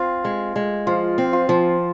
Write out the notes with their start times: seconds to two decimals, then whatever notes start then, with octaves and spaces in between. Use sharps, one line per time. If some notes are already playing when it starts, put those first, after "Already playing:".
Already playing: C4 F4
0.25 G#3
0.56 G#3
0.87 F3 F4
1.18 C4
1.33 F4
1.49 F3